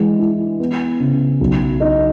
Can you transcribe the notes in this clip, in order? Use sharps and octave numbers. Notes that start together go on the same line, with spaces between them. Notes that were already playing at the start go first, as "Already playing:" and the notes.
Already playing: E3 G#3
E4
B3
C#3
B1
D#4